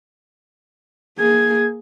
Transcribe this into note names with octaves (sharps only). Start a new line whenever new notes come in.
A#3 G#4 G#6